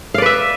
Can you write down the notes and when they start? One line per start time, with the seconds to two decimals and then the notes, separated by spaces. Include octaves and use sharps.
0.14 F5
0.18 D5
0.22 B4
0.26 E5